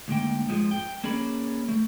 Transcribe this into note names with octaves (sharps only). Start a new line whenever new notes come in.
D2 G#2 A#3 G5
F2 G#2 F3 G#3
G5
A#3 C#4 G#4 D5 B5
A3